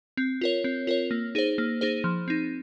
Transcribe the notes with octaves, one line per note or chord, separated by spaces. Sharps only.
C4
F4 A#4 C#5
C4
F4 A#4 C#5
A#3
D#4 G#4 C5
A#3
D#4 G#4 C5
F3
C4 D#4